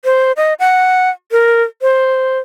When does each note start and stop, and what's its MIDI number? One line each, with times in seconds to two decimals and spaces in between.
0.05 0.32 72
0.37 0.54 75
0.59 1.10 78
1.31 1.63 70
1.82 2.39 72